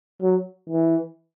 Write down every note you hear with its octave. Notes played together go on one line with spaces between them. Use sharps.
F#3
E3